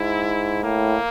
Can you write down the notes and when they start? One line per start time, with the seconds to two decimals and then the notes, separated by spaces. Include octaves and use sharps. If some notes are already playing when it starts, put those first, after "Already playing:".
Already playing: G#2 E4
0.64 A2 A#3